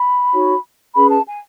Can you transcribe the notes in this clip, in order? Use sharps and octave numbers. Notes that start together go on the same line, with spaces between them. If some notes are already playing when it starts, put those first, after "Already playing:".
Already playing: B5
D#4 F#4 C#5
C#4 G#4 B4 B5
A5
G#5